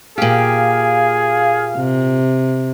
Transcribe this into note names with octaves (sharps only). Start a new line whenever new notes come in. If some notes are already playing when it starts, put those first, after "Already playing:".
A#2 G4 G#4 F5
C3